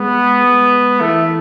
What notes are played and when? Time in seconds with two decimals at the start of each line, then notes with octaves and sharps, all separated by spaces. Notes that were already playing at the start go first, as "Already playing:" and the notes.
Already playing: G#3 B3
0.44 G#3
1.00 E3 A3